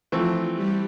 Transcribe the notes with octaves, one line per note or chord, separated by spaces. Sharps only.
E3 F3 A3 C4 F4
G3 G4